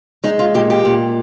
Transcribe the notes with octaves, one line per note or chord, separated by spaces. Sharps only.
G#3 D#4
F4
A#2 G4
G4
A#2